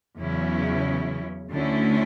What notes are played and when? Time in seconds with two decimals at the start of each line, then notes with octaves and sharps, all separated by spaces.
0.17 E2 C#3 F#3 C#4 E4
1.51 D2 D3 A3 C#4 E4